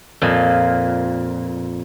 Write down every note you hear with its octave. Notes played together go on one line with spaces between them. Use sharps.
F2 A#2